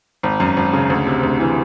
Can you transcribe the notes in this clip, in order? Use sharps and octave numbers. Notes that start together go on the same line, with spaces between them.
G#1
F#2
G#1
C#3
D2
C3
D2
E3